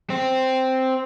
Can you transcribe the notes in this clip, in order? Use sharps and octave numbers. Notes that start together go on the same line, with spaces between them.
C4